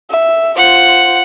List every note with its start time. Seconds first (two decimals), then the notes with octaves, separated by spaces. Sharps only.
0.11 E5
0.57 F4 C5 F#5